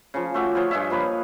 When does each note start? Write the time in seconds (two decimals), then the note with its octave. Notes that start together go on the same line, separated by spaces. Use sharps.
0.14 C#3 F3
0.34 A3 F#4 E5 D6
0.55 F4 G#4 C5 C#5
0.71 G2 G#4 D#5 E5
0.90 F3 A#3 B4 C#5